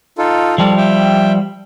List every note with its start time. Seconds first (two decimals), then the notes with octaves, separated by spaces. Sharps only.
0.18 D#4 F4 A4
0.58 F3 G3 A4
0.78 E5 G5